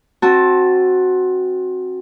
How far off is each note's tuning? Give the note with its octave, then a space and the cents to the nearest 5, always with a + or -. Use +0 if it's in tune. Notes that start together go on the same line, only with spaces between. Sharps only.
C4 +20 F#4 +0 A5 +0